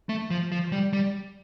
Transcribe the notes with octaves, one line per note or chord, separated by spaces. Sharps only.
A3
F3
F3
G3
G3